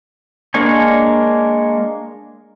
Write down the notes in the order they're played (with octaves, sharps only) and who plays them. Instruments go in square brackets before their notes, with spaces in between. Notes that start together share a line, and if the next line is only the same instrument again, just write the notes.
[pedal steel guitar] G#3 A#3 D4 C#5 G#5